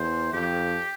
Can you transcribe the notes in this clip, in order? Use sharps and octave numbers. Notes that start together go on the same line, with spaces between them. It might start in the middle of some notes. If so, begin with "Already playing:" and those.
Already playing: E2 C5
F2 G4